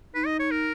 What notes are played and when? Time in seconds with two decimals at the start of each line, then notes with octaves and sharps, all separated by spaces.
0.14 D#4 B4
0.26 D#5
0.40 C#5
0.51 A#4